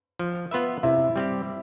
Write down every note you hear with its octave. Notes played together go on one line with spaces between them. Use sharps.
F3
B3 F4 B4 E5
C3 E4
G3 C4 G4